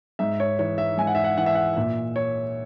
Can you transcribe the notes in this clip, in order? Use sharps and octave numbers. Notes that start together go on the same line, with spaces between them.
G#2 E5
C#5
E3 C#5
E5
G#2 G#5
F#5
E5
F#5
E3 F#5
E5
F#5
A#2 E5
C#5